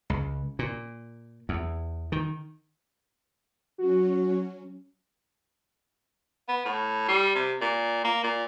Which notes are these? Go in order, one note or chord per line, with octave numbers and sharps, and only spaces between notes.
C#2
A#2
E2
D#3
F#3 C#4 F#4
B3
A2
G3
C3
A#2
A#3
A#2